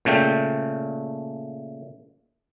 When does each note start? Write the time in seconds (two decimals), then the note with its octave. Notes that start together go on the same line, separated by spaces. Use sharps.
0.05 A#2 C#3 A3 G5